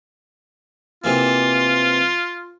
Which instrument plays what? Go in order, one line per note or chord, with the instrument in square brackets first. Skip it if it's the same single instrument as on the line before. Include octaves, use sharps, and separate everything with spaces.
[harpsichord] C3 E3 A#3 [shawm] F4